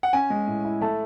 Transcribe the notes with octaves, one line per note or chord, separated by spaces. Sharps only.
F#5
C#4 G#5
G#3
A2
E4
A3 A5